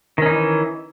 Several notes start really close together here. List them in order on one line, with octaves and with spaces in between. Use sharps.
D#3 C#4 D#4 E3